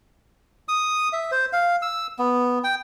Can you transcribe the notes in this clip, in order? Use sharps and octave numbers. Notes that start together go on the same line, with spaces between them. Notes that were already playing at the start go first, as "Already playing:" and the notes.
D#6
E5
C5
F5
E6
B3
G5